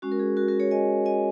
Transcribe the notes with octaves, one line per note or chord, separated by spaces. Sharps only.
G#3 C#4 F#4
A#4
G#4
F#4 A#4
F#4 A#4
G#4 C#5
D#5 G#5
D#5 G#5